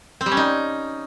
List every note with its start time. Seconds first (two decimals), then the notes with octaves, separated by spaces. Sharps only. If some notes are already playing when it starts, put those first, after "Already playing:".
0.21 C4
0.26 G3
0.32 C#4
0.37 D#4